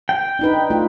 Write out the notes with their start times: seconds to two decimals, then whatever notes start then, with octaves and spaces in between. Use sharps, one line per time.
0.09 G5
0.39 D4 D#4 B4
0.70 A3 F4